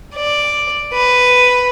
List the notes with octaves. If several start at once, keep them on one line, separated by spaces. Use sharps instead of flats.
D5
B4